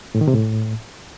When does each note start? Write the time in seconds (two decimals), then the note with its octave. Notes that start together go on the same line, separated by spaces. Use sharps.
0.15 A2
0.21 D#3
0.28 C3
0.34 A2